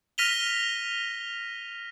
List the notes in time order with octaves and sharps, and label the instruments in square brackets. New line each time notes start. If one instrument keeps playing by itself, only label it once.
[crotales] F6 A#6 B6 D#7 F7 G7